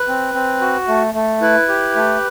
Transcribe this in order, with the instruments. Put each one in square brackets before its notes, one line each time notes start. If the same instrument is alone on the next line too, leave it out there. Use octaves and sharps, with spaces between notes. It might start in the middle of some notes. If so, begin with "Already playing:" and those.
Already playing: [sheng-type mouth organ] B4
C4
C4
F#4
A3
A3
E4 B4
G4
A3